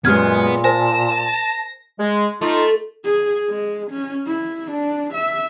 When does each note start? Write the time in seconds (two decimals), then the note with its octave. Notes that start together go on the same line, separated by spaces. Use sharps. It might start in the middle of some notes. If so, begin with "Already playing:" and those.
0.05 F#2 A#2 G#3 B3 G4 B4 F6 G#6
0.64 A#4 C5 G#5 A5 A#6
1.99 G#3
2.41 A3 D#4 F4
3.04 G#4
3.49 G#3
3.91 C#4
4.26 E4
4.71 D4
5.13 E5